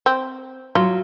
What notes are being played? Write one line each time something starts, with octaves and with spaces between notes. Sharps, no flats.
C4
F#3 F4